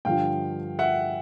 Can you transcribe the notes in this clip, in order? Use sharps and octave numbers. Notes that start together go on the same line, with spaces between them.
G2 D3 F3 F5 G5
E5 F#5